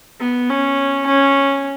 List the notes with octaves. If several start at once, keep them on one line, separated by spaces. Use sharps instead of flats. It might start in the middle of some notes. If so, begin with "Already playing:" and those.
B3
C#4
C#4